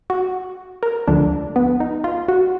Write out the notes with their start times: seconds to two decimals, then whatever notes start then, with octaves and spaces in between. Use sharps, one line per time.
0.10 F#4
0.83 A#4
1.08 D2 D3 F3 D4
1.56 B3
1.80 D#4
2.04 F4
2.28 F#4